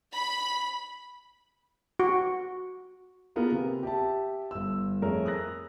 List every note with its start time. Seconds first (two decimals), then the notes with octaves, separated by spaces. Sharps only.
0.14 B5
2.00 F#4
3.36 A#3 B3 F4 G#4 A#4
3.52 C3
3.83 G4 E5 A5
4.51 G1 E6
5.02 F2 A3 G#4 A#4 C#5
5.25 D#6 E6 F#6 A#6